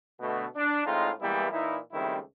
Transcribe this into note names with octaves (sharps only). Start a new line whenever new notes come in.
B2 D3 A3
D4
A2 G#3 C4 D#4 F4
E3 G3 G#3 A#3 B3 E4
A#2 E3 D#4 E4
C#2 D#3 G3 A3 C4 E4